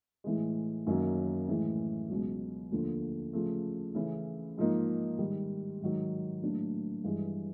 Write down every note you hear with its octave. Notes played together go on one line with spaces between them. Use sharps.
A2 E3 G#3
F#2 D#3 F#3 A#3
A2 E3 G#3
C#2 B2 F#3
D#2 D3 F3 A3
C#3 F3 A3
C#3 E3 A3 C#4 E4
G#2 F3 A#3 D#4
G#2 D#3 G3
G#2 D#3 F#3
A2 F#3 A#3 D4
G2 E3 G#3